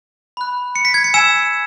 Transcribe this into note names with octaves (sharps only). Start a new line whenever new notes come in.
B5 F#6
C#7
B6
G#6
C#7
G#5 E6 E7